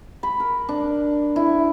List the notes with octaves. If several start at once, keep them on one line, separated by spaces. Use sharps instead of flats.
B5
A#4
D4
E4